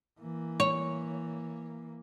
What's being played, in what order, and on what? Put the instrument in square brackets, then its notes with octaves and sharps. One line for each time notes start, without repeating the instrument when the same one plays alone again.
[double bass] E3 A#3
[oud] C#5